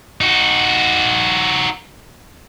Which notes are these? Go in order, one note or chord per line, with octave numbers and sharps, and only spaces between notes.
D#4 F#4